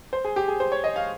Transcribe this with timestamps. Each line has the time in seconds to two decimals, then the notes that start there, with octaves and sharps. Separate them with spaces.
0.13 C5
0.24 G#4
0.36 G4
0.48 G#4
0.60 C5
0.72 C#5
0.84 D#5
0.96 F5